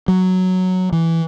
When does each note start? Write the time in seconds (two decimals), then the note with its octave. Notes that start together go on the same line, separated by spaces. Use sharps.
0.08 F#3
0.92 E3